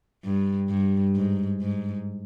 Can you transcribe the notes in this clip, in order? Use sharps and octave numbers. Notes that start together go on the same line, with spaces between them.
G2
G2
G#2
G#2